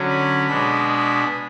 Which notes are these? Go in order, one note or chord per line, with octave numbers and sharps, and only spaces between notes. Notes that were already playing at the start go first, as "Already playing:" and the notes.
Already playing: D3 F#3 C#4
B5
B2 G#3 D4 B5